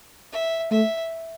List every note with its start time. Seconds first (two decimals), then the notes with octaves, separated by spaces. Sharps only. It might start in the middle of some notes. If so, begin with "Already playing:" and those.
0.32 E5
0.71 A3 E5